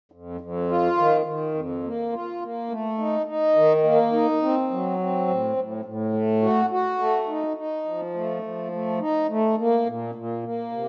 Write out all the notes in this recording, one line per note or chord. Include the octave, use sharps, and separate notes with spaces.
F2
F2
F4
D#3
D#3
F2
A#3
F4
A#3
A3
D#4
D#4
D#3
A#3
D#4
C4
F#3
C4
A2
A2
A2
A3
F#4
F#4
A3
D#4
D#4
F3
A3
F3
A3
D#4
A3
A#3
A#2
A#2
A#3
C3